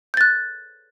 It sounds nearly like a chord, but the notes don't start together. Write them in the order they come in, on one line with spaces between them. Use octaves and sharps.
G6 A6 F#6